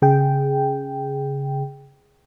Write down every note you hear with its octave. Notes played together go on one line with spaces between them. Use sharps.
C#3 G#4 G5